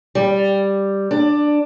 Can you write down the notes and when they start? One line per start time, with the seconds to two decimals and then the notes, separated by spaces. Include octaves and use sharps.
0.15 G3
1.11 D4